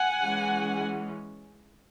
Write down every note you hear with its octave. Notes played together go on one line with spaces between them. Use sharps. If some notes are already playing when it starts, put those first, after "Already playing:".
Already playing: F#5 G#5
E3 G#3 C#4